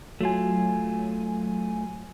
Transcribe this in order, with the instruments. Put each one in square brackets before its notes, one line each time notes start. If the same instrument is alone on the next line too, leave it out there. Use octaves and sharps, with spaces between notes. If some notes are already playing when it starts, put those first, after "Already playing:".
[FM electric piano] F#3 G#5 [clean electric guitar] A3 F4